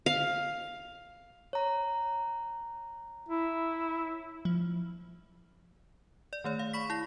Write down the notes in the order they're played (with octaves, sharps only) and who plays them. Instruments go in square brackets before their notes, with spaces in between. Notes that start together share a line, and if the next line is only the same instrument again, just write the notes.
[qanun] F5
[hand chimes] C#5 A#5
[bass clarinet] E4
[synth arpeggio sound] F3
[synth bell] D5
D#3 A3 C#5
F5
B5 C#6 B6
E4 A#6